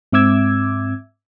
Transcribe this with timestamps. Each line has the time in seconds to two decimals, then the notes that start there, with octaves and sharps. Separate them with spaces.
0.12 G#2 C4 E5 D6 E6 G#6